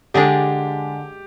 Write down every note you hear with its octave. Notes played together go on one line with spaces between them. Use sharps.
D3 G#3 D4 G4